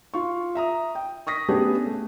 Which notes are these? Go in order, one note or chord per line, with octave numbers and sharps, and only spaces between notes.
F4 C#6
E5 A#5 D#6
G5
C#6 D#6 A#6 B6
A3 B3 C#4 D4 G4 G#4
A3